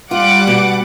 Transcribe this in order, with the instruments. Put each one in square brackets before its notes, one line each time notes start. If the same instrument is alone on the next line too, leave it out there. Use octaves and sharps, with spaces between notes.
[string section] G3 F#5 D6 [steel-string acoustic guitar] F4
[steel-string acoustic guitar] B2